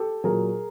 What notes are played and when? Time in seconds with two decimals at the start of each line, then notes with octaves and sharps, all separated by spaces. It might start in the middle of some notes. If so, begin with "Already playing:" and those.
Already playing: G4 A4
0.24 A#2 F#3 G#4 A#4